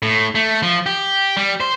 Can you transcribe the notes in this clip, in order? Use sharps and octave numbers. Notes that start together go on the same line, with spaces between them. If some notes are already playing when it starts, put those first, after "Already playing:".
A2
A3
F3
G4
G3
C5